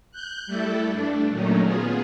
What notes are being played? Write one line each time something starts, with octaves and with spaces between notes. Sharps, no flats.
F#6 G6
G3 A3 E4 A4
G2 A3 D4
A#2 D#3 F#3 A3 C#4 D#4
B3 F4 G#4